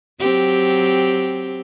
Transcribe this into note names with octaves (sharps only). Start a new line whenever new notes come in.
F#3 C4 G4